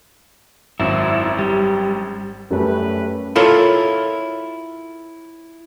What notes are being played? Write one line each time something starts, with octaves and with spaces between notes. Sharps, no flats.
G#1 F#2 E4
G3
F#2 G3 A3 C#4 G4 B4
E4 F4 A4 A#4 C#5 E5